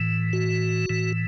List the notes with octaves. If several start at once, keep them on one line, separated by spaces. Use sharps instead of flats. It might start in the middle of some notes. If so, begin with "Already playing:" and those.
Already playing: A2 E3
F#4
A2 E3